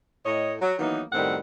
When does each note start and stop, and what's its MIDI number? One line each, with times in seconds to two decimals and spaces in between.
0.25 0.54 45
0.25 0.54 73
0.25 0.54 75
0.61 0.76 54
0.79 1.01 51
0.79 1.01 52
0.79 1.01 54
0.79 1.01 58
0.79 1.01 59
0.79 1.01 63
1.12 1.36 42
1.12 1.36 45
1.12 1.36 51
1.12 1.36 55
1.12 1.36 60
1.12 1.36 78